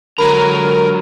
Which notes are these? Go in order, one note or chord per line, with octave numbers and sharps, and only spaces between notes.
D3 F#3 G#3 A#4 A#5 B5 D#7